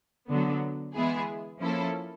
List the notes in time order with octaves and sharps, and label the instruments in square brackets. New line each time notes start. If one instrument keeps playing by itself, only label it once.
[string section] D3 F#3 B3
E3 G#3 B3 E4 G#4
F3 A#3 C#4 E4 A4